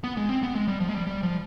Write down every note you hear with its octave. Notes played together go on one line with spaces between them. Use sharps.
B3
G#3
C4
B3
G#3
G3
F3
G#3
G3
G3
F3